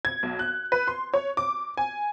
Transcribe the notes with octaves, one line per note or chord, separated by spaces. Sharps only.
G#6
B1
F#6
B4
C6
C#5
D6
G#5